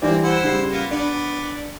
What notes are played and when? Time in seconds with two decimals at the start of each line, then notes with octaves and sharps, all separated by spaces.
0.02 E3 G3 A#3 C4 D5
0.23 E4 C5 F#5
0.43 C#3 G3 C7
0.71 A#3 B3 F4
0.91 B3 D4 D5